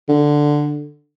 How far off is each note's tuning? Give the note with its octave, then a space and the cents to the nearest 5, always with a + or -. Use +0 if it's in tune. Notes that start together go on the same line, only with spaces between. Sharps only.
D3 +5